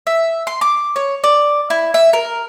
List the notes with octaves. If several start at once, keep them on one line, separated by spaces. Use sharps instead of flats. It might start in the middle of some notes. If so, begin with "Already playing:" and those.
E5
C6
D6
C#5
D5
E4
E5
A#4